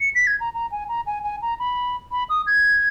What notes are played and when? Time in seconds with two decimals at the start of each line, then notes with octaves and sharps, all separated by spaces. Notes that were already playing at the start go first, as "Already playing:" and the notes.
0.01 C#7
0.15 B6
0.27 G#6
0.40 A#5
0.54 A#5
0.72 G#5
0.89 A#5
1.07 G#5
1.24 G#5
1.42 A#5
1.59 B5
2.12 B5
2.29 D#6
2.47 G#6